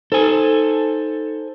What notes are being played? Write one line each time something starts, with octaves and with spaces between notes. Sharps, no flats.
D#4 A4 C5 G#5